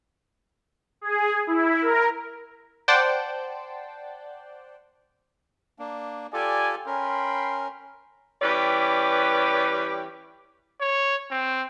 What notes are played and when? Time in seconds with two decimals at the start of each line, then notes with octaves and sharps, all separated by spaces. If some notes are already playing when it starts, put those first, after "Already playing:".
1.01 G#4
1.47 E4
1.82 A#4
2.88 C5 D5 F#5 G5 A5
5.79 A#3 D4
6.34 F4 G4 A4 D5 G#5
6.86 C#4 A#4 G5 B5 C6
8.42 E3 G3 C#4 G4 B4 D5
10.81 C#5
11.31 C4